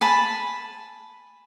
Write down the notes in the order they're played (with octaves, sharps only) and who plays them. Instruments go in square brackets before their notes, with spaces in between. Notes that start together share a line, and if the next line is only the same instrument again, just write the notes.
[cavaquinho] G#5 A5 B5